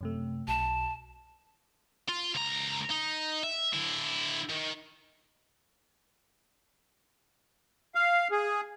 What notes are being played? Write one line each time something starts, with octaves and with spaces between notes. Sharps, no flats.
F#2 C3 A3
B1 A5
F4
C#2 A#5
D#4
E5
D3 E4
D#3
F5
G#4